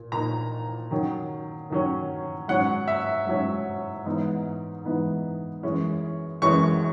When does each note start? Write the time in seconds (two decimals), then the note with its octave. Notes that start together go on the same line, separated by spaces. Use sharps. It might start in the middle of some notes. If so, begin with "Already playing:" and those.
Already playing: A#2
0.12 A#2 A#3 D#4 A#5
0.91 D#3 F#3 C#4
1.70 D#3 F#3 C#4
2.48 G#2 F#3 C#4 F#5
2.88 E5
3.27 G#2 F#3 C#4
4.05 G#2 E3 B3 D#4
4.85 G#2 E3 B3 D#4
5.63 F#2 E3 G#3 C#4
6.42 F#2 E3 G#3 C#4 C#6